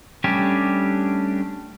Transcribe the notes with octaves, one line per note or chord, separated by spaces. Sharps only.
G3 A3 C#4 D4 G4